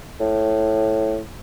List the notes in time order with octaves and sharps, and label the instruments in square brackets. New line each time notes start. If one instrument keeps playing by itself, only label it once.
[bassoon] A2